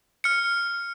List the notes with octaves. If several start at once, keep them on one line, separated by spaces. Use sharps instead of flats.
F6 C#7